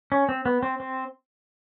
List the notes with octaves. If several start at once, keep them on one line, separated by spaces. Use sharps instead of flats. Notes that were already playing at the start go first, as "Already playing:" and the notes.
C#4
C4
B3
C4
C4